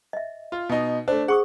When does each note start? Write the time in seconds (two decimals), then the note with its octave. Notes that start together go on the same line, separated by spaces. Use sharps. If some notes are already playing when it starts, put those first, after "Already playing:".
0.13 D#5 E5
0.52 F4
0.69 B2 D#4
1.08 A3 D4 C5
1.28 G#4 F#5 C#6 D#6